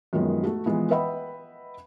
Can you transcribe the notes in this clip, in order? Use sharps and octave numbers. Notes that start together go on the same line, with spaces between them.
F#2 D#3 F3 G#3 B3
A3 F#4
E3 F3 G#3 B3
B4 D#5 E5 F#5 G5 B5